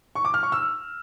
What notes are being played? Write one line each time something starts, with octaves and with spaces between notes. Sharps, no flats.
C#6
D6
F6
C#6
E6